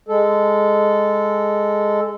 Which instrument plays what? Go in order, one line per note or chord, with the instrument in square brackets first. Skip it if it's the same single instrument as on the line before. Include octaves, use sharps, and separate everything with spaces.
[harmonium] G#3 A4